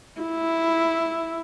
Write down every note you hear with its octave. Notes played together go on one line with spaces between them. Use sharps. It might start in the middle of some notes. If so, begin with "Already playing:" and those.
E4